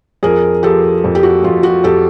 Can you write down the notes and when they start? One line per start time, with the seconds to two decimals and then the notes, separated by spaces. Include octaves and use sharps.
0.23 F2 G#4 A#4
0.63 F3 G4 A4
1.04 F2
1.15 G4
1.23 F#4
1.44 F2 F4
1.63 F#4
1.84 F2 G4 A4